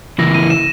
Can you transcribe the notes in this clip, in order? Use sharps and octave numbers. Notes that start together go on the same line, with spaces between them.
C#3 E3 A#3 E4 A#6
D#7
E7